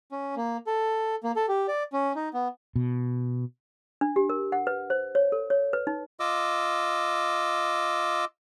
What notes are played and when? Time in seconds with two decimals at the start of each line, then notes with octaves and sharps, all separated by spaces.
0.12 C#4
0.36 A#3
0.67 A4
1.24 A#3
1.36 A4
1.48 G4
1.68 D5
1.93 C#4
2.15 D#4
2.34 B3
2.76 B2
4.01 D4
4.16 G4
4.30 A#4
4.52 F#5
4.67 B4
4.90 C5
5.15 C#5
5.32 A4
5.50 C#5
5.73 B4
5.87 D#4
6.20 F4 D#5 D6 E6